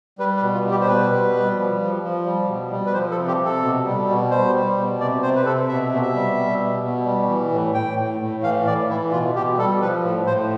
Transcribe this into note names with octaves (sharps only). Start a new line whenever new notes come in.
G3 B4
B4
B2
F4
G3
G4
C5
B2 B4
G3
G3
F3
F3
F3
G3
B2
G3
B4
F3 C5
A4
C3
G4
C3
A4
B2
G3
B2
G3 C5
G3
B2
C3 D5
C3 C5
B4
C3 A4
B2 E5
B2
E5
G3
G3
B2
B2
G3
E3
A2
A2 G5
A2
A2
E3 F5
A2 D5
E3 E4
B2 F4
B2 G4
G3 A4
F3 B4
A2
A2 C5